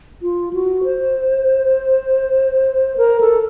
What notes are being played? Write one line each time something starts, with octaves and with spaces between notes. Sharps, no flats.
F4
F#4
C5
A#4
A4